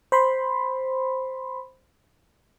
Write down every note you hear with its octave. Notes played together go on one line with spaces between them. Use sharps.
C5 B5 C6